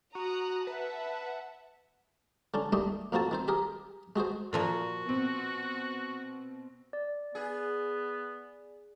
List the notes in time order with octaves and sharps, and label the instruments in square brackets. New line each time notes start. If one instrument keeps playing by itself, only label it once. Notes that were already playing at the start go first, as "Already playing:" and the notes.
[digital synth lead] F#4 [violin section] A#5 D#6 F#6
[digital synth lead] B4 [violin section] E5 F#5 A5
[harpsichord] D3 C#4 D4
D#2 G3 A3 G4 D#5
F2 A#3 C4 F#4 A5
D#3 C4 C5
G4 G#4 A#4
G#3 F#4 G#4 C5
[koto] A#2 F3 A#3 [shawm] F#4
[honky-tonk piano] B2 C4
[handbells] D5
[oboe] B3 [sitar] G#4